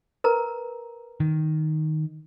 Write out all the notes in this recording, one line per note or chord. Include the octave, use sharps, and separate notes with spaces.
A#4 B4 A#5
D#3